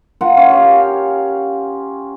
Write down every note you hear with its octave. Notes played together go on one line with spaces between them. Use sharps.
F4 A#4 F#5
C#4 F5
G4 F5